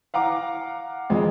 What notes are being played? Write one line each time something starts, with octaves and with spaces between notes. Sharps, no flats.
F5 F#5 A#5 D6
F2 G#3